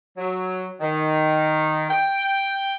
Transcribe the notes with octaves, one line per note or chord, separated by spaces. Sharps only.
F#3
D#3
G5